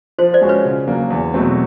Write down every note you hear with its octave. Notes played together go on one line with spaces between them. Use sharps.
F3 C5
C5 D5
G#3 C#4 F#4
B4 C#5
C#3
F#3 A#3 D4
E2
B2 F#3 A3 C4